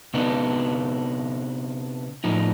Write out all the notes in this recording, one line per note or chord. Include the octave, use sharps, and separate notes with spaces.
C3 B3 D4 D#4
A2 F3 D#4